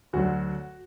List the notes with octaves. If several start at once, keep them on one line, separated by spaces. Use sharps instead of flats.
D2 D3 F#3 F#4